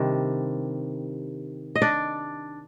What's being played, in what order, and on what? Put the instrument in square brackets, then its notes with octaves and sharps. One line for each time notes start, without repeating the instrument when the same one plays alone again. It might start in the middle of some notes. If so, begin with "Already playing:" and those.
Already playing: [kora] C3 D#3 G3 C4 D4
D#5
D4 D5